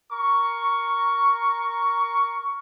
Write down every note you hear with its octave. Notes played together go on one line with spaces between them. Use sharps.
A#4 C#6